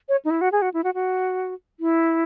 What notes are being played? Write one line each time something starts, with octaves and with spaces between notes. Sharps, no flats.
C#5
D#4
E4
F#4
G#4
F#4
E4
F#4
F#4
E4